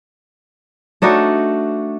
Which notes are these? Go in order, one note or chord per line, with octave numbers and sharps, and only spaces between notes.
A3 D4 D#4 F#4